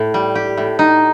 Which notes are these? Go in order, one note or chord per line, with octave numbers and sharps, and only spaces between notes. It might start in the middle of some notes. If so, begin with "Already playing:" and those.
Already playing: A2
G3
G4
A2
D#4